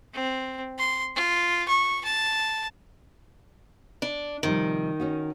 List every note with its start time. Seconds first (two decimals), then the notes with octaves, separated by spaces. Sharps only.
0.13 C4
0.79 C6
1.15 F4
1.68 C#6
2.05 A5
4.02 D4
4.43 C3 D#3 F3 G3
5.00 C#4 D#4 F#4